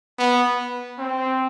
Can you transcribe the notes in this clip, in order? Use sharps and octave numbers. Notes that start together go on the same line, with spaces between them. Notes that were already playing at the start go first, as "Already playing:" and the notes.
B3
C4